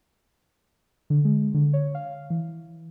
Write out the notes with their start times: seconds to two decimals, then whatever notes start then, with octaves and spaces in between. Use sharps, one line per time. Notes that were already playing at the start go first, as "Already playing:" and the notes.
1.10 D3
1.25 G#3
1.54 D3
1.73 C#5
1.95 F5
2.30 E3